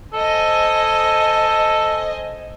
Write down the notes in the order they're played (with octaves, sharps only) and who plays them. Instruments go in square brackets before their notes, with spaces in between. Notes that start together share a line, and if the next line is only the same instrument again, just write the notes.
[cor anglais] A4 [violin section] C5 D#5 G#5